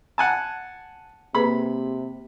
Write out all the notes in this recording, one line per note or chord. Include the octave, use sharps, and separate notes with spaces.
F#5 G#5 A5
C3 A#3 G#4 B4 B5